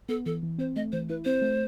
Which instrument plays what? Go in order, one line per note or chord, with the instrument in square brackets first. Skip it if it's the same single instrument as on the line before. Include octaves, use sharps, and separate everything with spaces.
[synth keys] B3 [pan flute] A4
[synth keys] E3 [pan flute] A4
[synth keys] E3
[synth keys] C4 [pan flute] C5
[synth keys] A3 [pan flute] D#5
[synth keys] E3 [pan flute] C5
[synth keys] E4 [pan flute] B4
[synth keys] C4 [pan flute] C5
[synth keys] A3